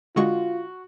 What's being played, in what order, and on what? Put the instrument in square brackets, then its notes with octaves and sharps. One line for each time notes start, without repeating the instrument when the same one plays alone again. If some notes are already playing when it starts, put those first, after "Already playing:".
[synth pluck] D3 G#3 C#6 [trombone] F4 [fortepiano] F#4